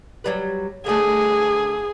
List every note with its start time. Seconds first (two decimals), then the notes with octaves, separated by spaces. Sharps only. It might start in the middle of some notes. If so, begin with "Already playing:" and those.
0.24 F#3 G3 B4
0.86 D3 A3 G#4